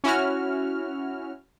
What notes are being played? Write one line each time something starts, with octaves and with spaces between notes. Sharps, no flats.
C#4 E4 F#4 F6